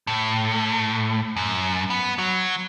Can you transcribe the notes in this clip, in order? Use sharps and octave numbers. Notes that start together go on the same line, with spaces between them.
A2
F#2
B3
F#3